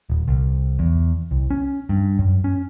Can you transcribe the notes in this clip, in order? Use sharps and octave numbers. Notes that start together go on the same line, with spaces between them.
D#1
C2
E2
C2
C#4
G2
F#2
C#4